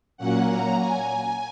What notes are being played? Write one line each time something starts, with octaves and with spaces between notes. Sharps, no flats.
A#2 F#3 A#3 C#4 F#5
A#5
G#5